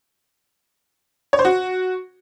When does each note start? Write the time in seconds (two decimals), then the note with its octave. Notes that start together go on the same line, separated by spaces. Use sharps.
1.33 C#5
1.39 C5
1.45 F#4